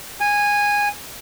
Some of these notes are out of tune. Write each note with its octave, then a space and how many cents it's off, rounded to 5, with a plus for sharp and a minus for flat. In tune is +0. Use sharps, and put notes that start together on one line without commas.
G#5 -15